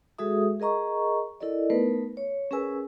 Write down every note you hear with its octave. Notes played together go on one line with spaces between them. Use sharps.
G#3 F#4 G#4 A4 E5 D#6
G#4 A#4 D#5 A#5 C#6
E4 A4 A#4 D5 D#5
A3 B3 D#4 A#4 B4
C#5
C#4 G#4 A#4 B4 G#5 E6